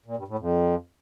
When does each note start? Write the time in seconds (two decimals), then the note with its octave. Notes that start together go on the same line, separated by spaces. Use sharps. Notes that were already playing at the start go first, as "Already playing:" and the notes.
0.06 A#2
0.17 G2
0.28 A2
0.39 F2